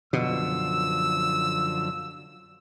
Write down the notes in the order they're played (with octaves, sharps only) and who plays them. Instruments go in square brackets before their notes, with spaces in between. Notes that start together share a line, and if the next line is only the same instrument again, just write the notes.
[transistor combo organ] F#2 D3 F3 [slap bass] B2 [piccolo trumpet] E6